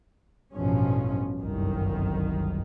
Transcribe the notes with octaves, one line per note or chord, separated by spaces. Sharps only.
A1 G2 B2 F3 C#4
G1 C2 F#2 D#3